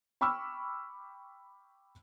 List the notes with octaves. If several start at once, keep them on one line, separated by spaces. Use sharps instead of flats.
G5 B5 C#6 D6 E6 F6